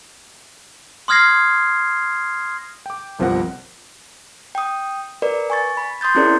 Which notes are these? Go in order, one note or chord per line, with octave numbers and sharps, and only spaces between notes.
C6 D#6 F6 G#6 A#6 C7
G5 D6
G1 C2 F3 C4 A#4 F#5
G5 D#6
A#4 B4 D5
G#5 C#6 A6
B5
C6 D#6 G6 A6
C4 C#4 E4 G#4 A#4 D5